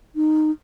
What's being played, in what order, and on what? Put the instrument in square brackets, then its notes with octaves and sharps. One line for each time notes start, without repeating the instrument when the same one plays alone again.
[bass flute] D#4